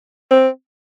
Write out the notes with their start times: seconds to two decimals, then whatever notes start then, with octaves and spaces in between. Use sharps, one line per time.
0.31 C4